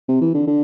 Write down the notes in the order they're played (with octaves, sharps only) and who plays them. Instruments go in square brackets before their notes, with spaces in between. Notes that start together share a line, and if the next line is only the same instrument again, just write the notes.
[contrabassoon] C3
E3
D3
D3